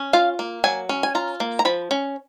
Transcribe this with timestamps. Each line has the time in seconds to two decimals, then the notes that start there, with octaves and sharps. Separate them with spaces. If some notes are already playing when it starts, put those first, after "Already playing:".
Already playing: C#4
0.13 F4 F5
0.39 A#3
0.64 F#3 G#5
0.89 C#4
1.03 G#5
1.15 F4 A#5
1.40 A#3
1.59 A#5
1.65 F3 B5
1.91 C#4